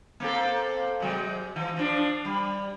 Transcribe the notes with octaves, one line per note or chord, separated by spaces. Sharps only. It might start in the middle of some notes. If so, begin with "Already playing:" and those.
A#3 C4 A4
C3 F#3 G#3
E3
F3 D4
G3